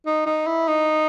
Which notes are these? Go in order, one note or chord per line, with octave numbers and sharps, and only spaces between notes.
D#4
D#4
E4
D#4